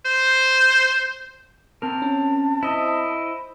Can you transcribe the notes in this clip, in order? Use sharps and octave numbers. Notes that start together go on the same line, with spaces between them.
C5
C4 A#4 A5
C#4
E4 C5 D#5